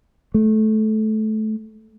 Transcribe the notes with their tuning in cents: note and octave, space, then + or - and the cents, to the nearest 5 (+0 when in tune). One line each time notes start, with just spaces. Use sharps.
A3 -20